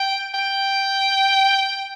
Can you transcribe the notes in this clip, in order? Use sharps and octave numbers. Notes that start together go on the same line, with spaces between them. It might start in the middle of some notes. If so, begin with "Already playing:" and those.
Already playing: G5
G5